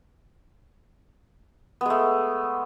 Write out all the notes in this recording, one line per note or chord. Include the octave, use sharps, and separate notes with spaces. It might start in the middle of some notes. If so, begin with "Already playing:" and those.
G#3 A3 B3